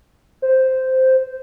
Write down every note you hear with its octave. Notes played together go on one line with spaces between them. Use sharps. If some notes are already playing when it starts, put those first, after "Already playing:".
C5